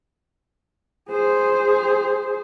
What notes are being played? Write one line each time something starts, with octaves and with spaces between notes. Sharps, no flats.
G#4 C5